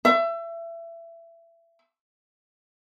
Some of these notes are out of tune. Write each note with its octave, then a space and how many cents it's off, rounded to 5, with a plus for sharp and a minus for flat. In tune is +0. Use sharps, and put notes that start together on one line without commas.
E5 +25